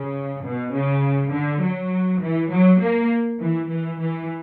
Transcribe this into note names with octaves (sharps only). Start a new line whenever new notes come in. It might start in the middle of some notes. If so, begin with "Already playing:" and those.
Already playing: C#3
B2
C#3
D3
F#3
E3
F#3
A#3
E3
E3
E3